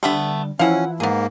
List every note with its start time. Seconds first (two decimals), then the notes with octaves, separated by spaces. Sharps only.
0.03 D3 G3 A3 B3 E5
0.59 E3 F3 C#4 E4 F5 F#5
1.00 G#2 A#3 B3 G#4